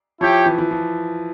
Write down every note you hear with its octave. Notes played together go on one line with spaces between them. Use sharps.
F3 E4 G4 C#5 G5
E3
E3
F3